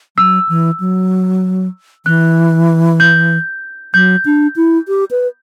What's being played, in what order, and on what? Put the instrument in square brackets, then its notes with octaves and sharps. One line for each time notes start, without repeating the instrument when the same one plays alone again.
[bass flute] F#3 [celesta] E6
[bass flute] E3
F#3
[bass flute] E3 [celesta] F#6
[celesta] G6
[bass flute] F#3 [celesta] G6
[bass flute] D4
E4
G4
B4